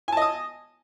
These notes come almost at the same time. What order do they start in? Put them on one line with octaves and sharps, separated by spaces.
G#5 A5 D#5 D#6